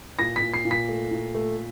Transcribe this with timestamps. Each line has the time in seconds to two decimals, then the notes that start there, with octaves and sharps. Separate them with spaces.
0.19 A#2 A#6
0.36 B6
0.42 A#2
0.54 C7
0.65 A#2
0.71 B6
0.88 A3
1.11 A#2
1.34 A3